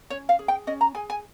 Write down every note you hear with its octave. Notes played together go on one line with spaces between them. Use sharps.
C#4 C#5
F5
G#4
G5
C#4 D#5
A#5
G#4 G#5
G#5